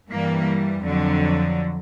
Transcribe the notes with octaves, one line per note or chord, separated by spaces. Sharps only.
G2 E3 G3 A#3
F2 D3 F#3